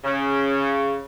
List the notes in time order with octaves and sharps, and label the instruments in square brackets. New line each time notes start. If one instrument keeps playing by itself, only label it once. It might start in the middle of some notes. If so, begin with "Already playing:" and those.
[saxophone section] C#3